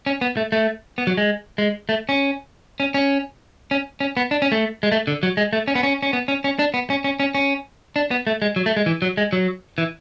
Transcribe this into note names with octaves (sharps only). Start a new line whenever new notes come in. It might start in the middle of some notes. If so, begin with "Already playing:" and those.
C#4
B3
A3
A3
B3
F#3
G#3
G#3
A3
C#4
C#4
C#4
C#4
C#4
B3
D4
C#4
A3
G#3
A3
D3
F#3
G#3
A3
C#4
B3
C#4
C#4
B3
C#4
C#4
D4
B3
C#4
C#4
C#4
C#4
D4
B3
A3
G#3
F#3
A3
G#3
E3
F#3
G#3
F#3
E3